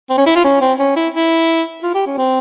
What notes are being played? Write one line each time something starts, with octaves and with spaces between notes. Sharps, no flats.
C4
C#4
E4
F4
C#4
C4
C#4
E4
E4
F4
G4
C#4
C4